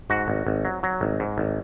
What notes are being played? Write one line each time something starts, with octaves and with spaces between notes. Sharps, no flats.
G#2 F#4
G#1
G#1
F#3
F#3
G#1
G#2
G#1